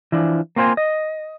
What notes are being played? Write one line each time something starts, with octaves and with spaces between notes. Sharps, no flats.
E3 F3 D4
A#3 C4 F4 C5 G#5
D#5